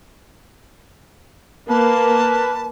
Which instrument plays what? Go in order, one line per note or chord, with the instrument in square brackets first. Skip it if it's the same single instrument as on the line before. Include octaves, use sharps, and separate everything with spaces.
[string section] A#3 [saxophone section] B4 [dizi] A5